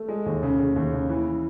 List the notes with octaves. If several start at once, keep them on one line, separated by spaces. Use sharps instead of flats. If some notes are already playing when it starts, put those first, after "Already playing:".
Already playing: A3
G#3
D#2
C#3
C#3
D#2
C#3
E3